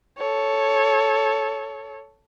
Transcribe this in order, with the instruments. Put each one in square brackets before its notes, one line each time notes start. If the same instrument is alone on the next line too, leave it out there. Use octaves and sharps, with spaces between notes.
[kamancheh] A4 C#5